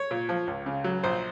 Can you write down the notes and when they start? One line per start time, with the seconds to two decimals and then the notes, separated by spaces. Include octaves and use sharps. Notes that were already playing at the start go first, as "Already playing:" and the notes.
Already playing: C#5
0.11 A#2
0.29 F3
0.47 C#2
0.66 C#3
0.84 F#3
1.03 A#1 C5